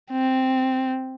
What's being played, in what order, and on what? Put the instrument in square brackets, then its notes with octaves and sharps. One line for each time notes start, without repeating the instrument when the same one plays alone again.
[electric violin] C4